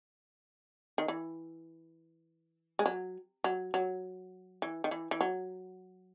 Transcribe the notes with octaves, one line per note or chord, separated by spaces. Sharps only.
D#3
E3
G#3
F#3
F#3
F#3
E3
D#3
E3
E3
F#3